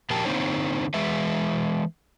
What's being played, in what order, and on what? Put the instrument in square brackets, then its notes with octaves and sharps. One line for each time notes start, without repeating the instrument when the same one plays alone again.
[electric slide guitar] A#2 F3 G4 A#4 G5 A5
D3 A#3 C4 D#4 C5 C#5
E3 G#3 G#4 B4 E5